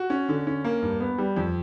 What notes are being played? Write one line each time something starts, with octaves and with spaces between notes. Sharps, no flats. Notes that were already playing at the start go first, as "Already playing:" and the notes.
Already playing: F#4
C#4
D3
C#4
A#3
G2
B3
G3
F2